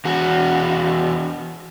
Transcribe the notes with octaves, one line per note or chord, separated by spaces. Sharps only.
E2 F#4